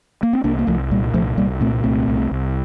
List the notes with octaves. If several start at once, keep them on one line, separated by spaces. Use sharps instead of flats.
A#3
C4
C2 A#3 D4
A#3
C2 F3 A3
A#2 G3 A#3
C2 F3 A3
C2 G3 A#3
A#2 A3 C4
C2 A3 C4
C2
C2